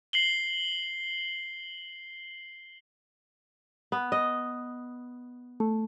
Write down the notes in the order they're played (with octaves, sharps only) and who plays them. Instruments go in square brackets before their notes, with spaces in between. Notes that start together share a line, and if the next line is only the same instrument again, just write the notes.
[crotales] C7 F#7 G7
[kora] B3
D#5
[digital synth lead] A3